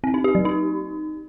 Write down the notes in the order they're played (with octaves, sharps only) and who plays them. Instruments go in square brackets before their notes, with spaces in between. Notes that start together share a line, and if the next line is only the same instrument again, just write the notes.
[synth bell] C4
D#4
G4
F#3
D#4